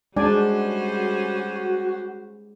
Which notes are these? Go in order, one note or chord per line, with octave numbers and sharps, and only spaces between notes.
G3 G#3 C#4 D4 F#4 C5 D5 G#5